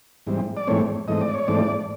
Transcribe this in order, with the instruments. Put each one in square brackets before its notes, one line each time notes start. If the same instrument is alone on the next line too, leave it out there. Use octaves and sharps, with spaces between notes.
[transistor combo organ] G#2 E3 G3 C4
D5
G#2 E3 A3 C4 C#5
G#2 E3 A3 C4 D#5
D5
C#5
G#2 E3 A3 C4 D5